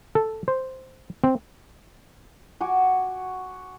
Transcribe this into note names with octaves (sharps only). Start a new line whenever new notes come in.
A4
C5
C4
F#4 G#5 D6